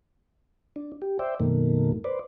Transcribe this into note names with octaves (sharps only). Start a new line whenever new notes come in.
D4
G4
C5 D5 E5 G5
F#2 B2 D#3 A3 A#3
B4 C5 D5